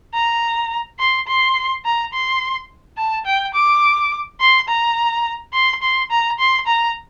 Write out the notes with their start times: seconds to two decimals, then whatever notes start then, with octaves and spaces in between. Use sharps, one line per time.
0.14 A#5
0.99 C6
1.27 C6
1.85 A#5
2.13 C6
2.98 A5
3.26 G5
3.55 D6
4.41 C6
4.68 A#5
5.54 C6
5.82 C6
6.11 A#5
6.39 C6
6.67 A#5